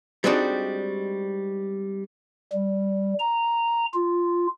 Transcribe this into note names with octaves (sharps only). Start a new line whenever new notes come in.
G3 G#3 C4 D4 D#4 F#4
G3
A#5
F4